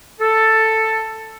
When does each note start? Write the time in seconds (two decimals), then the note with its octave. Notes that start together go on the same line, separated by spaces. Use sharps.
0.19 A4